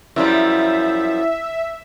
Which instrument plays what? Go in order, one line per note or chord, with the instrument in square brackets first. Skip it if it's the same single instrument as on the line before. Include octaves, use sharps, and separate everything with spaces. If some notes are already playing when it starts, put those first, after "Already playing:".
[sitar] F#2 F3 G3 [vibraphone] E4 [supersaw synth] E5